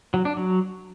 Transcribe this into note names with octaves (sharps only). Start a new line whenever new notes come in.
F#3
D4
F#3